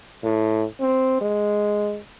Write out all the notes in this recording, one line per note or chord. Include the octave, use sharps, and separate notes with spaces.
A2
C4
G#3